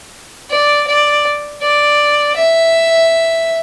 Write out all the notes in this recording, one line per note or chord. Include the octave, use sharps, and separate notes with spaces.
D5
D5
D5
E5